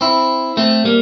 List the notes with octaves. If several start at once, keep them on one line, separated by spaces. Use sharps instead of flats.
C4 E4
A3 C4
G3 A#3